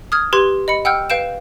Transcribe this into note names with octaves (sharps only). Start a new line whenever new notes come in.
D#6 F6 G#6
G4 B4 C6 G#6
D#5 B5 C#7
F#5 G5 E6 F6 G6
B4 F5 G6 D7 E7